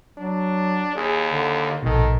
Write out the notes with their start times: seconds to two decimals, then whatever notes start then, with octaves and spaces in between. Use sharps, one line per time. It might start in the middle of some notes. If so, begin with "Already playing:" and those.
0.17 F#3 D4
0.95 D#2 G#4
1.29 D3
1.83 A#1 G#2 B2 D#3 A4